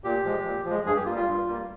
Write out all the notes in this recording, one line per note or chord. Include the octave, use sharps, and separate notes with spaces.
A#2 G4
F3 G#3
A#2
F3 G#3
G2 G#4
G4
G3 A#3 F4
F4
G2
G3 A#3